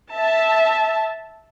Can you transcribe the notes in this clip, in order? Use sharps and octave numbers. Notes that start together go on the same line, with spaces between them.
E5 A5